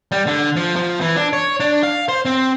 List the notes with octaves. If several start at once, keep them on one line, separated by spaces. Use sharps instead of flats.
G3
D3
F3
F3
E3
D4
C#5
D4
F5
C5
C4